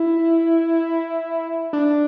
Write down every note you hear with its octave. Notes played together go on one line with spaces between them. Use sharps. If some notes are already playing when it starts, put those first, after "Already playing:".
Already playing: E4
D4